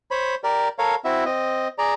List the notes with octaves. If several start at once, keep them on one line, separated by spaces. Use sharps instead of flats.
C5 C#5 B5
G4 A#4 D5
A4 A#4 C#5 F5
C4 E4 F#4 E5
C4 D#5
G#4 D5 A#5